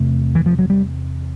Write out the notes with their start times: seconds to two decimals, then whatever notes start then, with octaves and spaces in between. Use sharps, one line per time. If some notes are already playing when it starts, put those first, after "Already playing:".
Already playing: E2 C3 A3
0.35 E3
0.46 F3
0.59 F#3
0.70 G3